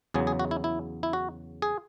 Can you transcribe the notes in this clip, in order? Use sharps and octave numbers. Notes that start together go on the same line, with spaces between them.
E2 C#3 F#3 G#4
G#4
F#4
E4
E4
E4
F#4
G#4